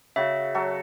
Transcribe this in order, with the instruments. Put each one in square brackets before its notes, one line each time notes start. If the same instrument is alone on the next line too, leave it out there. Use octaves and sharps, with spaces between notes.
[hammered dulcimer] C#3 F#4 [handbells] E5
[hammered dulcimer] F#3 F#4 A4